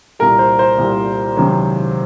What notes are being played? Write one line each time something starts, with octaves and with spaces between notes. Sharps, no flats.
C2 A#2 G3 A#4
C5
C5
C2 A#2 G3
C#2 C3 D#3 F#3